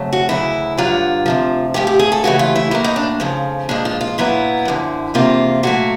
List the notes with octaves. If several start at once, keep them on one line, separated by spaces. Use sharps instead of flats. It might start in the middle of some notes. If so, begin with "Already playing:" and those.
Already playing: F2 C#3 F#3 A3
F#4
D2 C#3 F#3 E4
G2 D3 F#3 F4
D2 C3 F3
G#2 F3 A3 G4
G4
G#4
A4
D#2 C#3 E3 A3 F#4
F4
E4
A2 F#3 A#3 E4
D#4
D4
F2 C#3 F3
A#2 F3 G#3 D4
F4
F4
A#2 F#3 B3 E4
F#2 D3 F3
E2 C3 F3 A#3 F4
A#2 F#3 A3 F#4